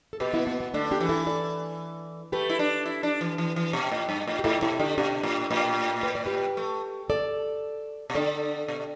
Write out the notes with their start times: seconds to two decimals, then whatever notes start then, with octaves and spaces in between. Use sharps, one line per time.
0.13 A4
0.20 B2 G4 B4
0.34 B3 E4
0.47 B3
0.60 B3
0.74 D3 A3 D4
0.91 D4 G4
1.00 E3
1.09 E4 A4
1.27 A4 D5
2.32 A3 G4 B4
2.49 E4
2.59 D4
2.86 E4
3.03 D4
3.21 E3
3.38 E3
3.56 E3
3.73 B2
3.91 A2
4.09 G2
4.27 A2
4.39 G4
4.44 A2 E4 A4
4.62 B2 E4 A4
4.79 D3 D4 G4
4.98 B2 D4 G4
5.23 A2
5.51 A2
6.03 B4
6.15 D5
6.26 G4 B4
6.57 A3
7.10 A4 D5
8.10 B2
8.15 D3 A4 D5
8.68 B2